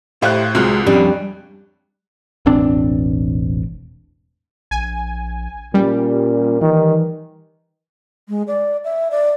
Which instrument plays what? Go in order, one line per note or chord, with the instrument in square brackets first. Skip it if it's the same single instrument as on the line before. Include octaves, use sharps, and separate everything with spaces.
[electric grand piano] A2 C5 F#6 [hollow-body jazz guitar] G4 E5 F5
[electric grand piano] C2 [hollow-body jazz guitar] G#3 F4 F#4
[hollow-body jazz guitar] F2 C#4 D4 [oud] G3
[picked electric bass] E1 A1 C4 D4
[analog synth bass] A#1 [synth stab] G#5
[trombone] A#2 [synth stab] G3 [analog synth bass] C#4
[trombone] D#3 [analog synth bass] E3
[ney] G#3
D5
E5
D5